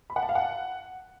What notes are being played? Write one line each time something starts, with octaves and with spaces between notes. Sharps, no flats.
B5
F#5
A5
F5
F#5